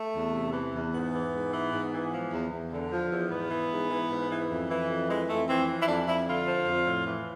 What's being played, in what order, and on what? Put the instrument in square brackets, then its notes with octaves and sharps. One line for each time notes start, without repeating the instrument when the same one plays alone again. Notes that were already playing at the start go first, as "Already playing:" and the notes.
Already playing: [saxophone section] A3
E2
C3
E3
E2
G#2 B3
E3
G#2
E3
G#2
E3
F3
E2
E2
D3
F3
E2
G#2 B3
E3
G#2
E3
G#2
E3
F2
E3
F2
E3 G#3
F2 A3
E3 C4
F3
E4
F2 D4
F2 E4
D3 F4
F3
F2
A2
E3